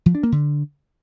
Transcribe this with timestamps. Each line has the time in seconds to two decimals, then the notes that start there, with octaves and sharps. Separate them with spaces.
0.06 F3
0.15 D4
0.23 A#3
0.32 D3